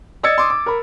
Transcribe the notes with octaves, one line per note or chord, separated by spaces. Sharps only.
D5 D#5 E6 G#6 A6 C#7
C6 D6 D#6
D6
A#4 B5